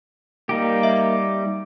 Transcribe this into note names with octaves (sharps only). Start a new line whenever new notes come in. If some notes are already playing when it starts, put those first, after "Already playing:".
G3 A#3 D#4 G4
E5